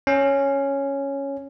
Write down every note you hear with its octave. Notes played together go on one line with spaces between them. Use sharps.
C#4